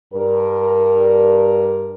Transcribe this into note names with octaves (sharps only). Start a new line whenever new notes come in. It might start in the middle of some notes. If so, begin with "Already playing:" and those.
G2 A#4